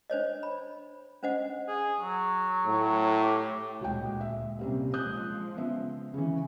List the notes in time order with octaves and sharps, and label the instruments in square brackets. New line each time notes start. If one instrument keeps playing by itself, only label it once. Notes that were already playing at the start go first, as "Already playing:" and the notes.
[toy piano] D4 C5 C#5 D#5
B5
C#4 D4 C5 D#5 F#5
[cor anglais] G#4
F#3
[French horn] A2
[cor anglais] G4
[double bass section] D2 A#2 G#3 [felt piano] F#4 G5
[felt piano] E5
[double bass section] C3 A#3 [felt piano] G3 C4 C#4
[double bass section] F3 G#3 [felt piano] D#6 F#6 G6
[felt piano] C#3 B3 E5
[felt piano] C#3 E3 [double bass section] C#4